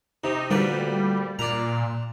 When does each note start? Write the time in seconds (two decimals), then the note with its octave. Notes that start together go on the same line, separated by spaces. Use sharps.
0.24 C3 D#4
0.51 D2 A#2 G3 B4
1.39 A#2 D4 A#5